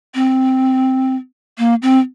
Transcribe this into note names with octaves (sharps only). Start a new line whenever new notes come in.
C4
A#3
C4